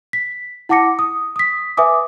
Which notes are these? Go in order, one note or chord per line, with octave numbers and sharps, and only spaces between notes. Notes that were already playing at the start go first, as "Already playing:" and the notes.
B6
E4 F#5 A5 D6 A#6 C#7
D#6
D#6 B6
B4 E5 G#5 D6 D#6